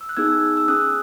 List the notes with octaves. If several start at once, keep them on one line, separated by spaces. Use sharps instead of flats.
E6
F#6
B3 D#4 G#4 E6 G#6
E6
C#4 G#4 D#6 F#6